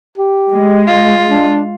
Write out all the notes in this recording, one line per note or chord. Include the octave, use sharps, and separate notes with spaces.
G4
G#3
F4
D4